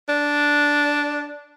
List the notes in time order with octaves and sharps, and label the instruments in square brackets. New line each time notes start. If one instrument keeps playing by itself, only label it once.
[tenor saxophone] D4